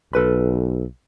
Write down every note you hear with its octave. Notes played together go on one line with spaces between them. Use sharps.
B1 A4 B4 B5